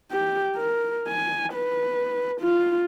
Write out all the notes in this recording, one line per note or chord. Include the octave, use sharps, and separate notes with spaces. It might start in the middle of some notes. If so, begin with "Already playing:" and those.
G4
A#4
G#5
B4
F4